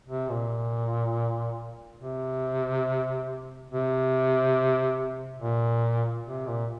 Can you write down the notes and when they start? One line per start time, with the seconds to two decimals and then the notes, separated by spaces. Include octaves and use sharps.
0.08 C3
0.30 A#2
2.00 C3
3.70 C3
5.40 A#2
6.25 C3
6.47 A#2